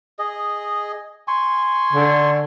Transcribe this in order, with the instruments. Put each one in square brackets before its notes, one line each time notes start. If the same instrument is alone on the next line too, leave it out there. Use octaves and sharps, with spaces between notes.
[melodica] G#4 D#5
G#5 C6 C#6
[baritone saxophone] D3